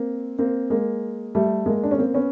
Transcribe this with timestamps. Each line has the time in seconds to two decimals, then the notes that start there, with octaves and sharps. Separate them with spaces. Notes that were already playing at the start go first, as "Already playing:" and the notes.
Already playing: A#3 C4
0.38 A#3 C4
0.70 G#3 A#3
1.35 G3 A3
1.66 G#3 A#3
1.83 D4
1.91 C#4
1.98 A#3 C4
2.14 B3 C#4